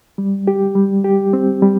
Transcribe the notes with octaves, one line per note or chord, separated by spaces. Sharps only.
G3
G4
G3
G4
C4
G3